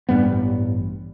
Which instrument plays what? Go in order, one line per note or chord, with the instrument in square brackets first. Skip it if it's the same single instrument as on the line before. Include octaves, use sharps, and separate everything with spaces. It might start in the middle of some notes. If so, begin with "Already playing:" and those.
[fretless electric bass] A1 G2 G3 B3